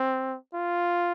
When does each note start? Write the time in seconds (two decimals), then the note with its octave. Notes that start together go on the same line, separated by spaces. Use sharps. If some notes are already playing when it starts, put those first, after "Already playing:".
Already playing: C4
0.54 F4